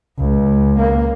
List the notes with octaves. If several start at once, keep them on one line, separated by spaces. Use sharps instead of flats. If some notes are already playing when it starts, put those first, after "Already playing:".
C#2
A#3